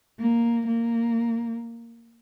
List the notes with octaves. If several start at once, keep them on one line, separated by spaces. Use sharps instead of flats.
A#3
A#3